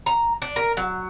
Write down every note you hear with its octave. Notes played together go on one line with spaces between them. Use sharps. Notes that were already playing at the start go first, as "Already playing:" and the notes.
A#5
D4
A#4
F#3